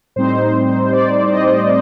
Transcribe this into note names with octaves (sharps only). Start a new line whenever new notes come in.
A2 G3 C4 D#4 C5
D5
D#5